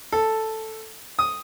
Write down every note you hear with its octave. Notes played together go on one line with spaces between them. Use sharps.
A4
D#6